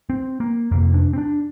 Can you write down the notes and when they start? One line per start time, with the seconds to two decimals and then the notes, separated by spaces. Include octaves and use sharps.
0.10 C4
0.40 A#3
0.71 F2 C3 A#3
0.94 D4
1.13 C4
1.18 D4